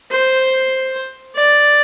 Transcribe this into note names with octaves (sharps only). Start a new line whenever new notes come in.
C5
D5